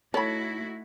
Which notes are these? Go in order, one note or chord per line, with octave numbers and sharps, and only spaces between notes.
A3 D#4 E4 F#4 A4 C#5 B5